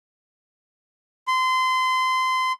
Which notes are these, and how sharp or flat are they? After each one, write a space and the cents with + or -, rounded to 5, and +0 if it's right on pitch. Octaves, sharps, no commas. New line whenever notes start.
C6 -25